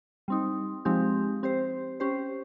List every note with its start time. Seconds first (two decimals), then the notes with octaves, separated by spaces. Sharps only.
0.28 G3 C4 D#4
0.85 F3 G#3 C4 D#4 G4
1.43 C4 G4 C5
2.00 C#4 G4 C5